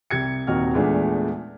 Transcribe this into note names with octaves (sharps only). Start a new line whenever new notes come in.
C2 G4 G#6 C#7
D#1 D#2 C3 F#4 D#5 F6
E2 A#2 G#3 A3 B3 D4